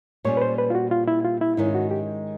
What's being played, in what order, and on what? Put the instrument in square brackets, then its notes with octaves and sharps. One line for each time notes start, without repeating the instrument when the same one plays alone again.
[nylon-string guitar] A#2 G3 A#3 C#4 [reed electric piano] C#5
[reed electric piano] B4
C5
B4
F4
F#4
F4
E4
F4
E4
[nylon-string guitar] G#2 D#3 G#3 C#4 [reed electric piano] E4
[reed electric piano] F#4
G4